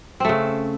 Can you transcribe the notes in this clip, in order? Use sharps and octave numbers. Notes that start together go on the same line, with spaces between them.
C#3 A3 C4